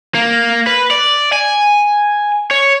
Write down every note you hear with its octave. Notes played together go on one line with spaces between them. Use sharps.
A#3
B4
D5
G#5
C#5